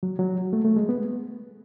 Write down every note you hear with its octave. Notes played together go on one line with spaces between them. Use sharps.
F#3
F#3
A3
A3
G#3
B3